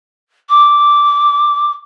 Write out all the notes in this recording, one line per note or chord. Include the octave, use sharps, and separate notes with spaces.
D6